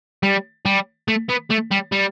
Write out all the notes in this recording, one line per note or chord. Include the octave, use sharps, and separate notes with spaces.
G3
G3
A3
B3
A3
G3
G3